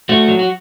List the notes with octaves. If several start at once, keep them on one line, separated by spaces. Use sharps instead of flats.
A3 F#4
F#3
F#4